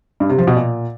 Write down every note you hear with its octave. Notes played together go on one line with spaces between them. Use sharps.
G2
C3
F3
B2
A#2